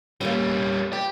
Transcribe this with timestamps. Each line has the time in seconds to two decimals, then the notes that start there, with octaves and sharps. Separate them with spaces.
0.21 G3 A#3 C#4 B4 G5
0.93 G4 B4